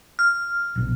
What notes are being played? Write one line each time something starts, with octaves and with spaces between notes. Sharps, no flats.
F6
D1 A#1 B2